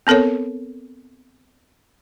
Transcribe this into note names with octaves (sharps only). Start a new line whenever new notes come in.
B3 C4 A4 A#4 C#5